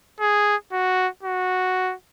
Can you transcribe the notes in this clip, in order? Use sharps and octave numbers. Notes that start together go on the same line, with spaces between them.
G#4
F#4
F#4